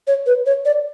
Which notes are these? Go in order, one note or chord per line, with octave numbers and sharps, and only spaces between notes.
C#5
B4
C#5
D5